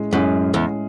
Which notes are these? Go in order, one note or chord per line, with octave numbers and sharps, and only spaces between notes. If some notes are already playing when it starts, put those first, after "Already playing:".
Already playing: A2 G#3 C#4 G#4
F#2 A2 G#3 C#4 G#4
E2